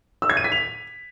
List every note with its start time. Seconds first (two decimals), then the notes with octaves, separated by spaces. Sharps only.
0.22 E6
0.30 G#6
0.37 D#7
0.44 B6
0.52 F7